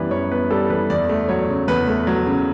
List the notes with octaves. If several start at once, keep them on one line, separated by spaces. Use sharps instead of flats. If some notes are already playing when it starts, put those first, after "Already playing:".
Already playing: F#2 E3 G3 B3 B4
F#2 C#5
B3 B4
G3 A4
E3 B4
E2 D5
A3
F#3 C#5
C#3
E2 B4
A3
F#3
C#3